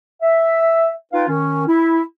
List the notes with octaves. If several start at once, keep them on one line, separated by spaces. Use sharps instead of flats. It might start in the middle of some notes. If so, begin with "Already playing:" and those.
E5
D#4 F4 B4 F5 G5
D#3 C#4
E4